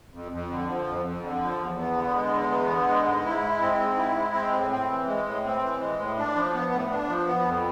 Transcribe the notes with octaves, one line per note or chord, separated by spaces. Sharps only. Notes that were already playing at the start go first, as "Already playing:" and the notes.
F2
F2
D3
F3
F2
F2
D3
F3
E2
B3
D3
G#3
E2
B3
D3
G#3
G#2
E4
G#3
C4
G#2
E4
G#3
C4
A2
C4
E3
G#3
A2
C4
E3
G#3
A2
D4
F3
B3
A2
D4
F3
B3
F2